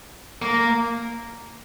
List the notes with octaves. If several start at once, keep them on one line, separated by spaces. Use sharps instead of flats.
A#3